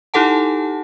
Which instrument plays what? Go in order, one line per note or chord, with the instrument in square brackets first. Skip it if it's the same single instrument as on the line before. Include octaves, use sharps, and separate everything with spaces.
[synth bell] D#4 E4 G4 A4 F#5 A5